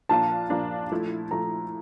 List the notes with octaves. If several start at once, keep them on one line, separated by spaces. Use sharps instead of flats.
A#2 F3 A#3 D4 F4 A5
A#2 F3 A#3 D4 F4
F3 A3 E4
F3 A3 E4 A#5